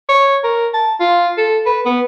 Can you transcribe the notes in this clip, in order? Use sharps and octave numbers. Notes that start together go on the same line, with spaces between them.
C#5
A#4
A5
F4
A4
B4
B3